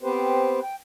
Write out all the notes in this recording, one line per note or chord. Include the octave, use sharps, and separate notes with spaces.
B3 C4 G4 B4 C5
G5